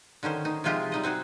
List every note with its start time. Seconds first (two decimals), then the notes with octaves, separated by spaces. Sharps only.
0.23 D3 D#3 C#4 C5
0.45 D#4
0.64 C3 F3 G#3 F4 G4 G#4
0.92 G3 D#4 D#5
1.03 C4 D#4 F#4 G#4